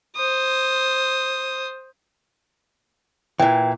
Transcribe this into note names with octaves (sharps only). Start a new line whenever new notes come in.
C5 D#6
A#2 E3 G5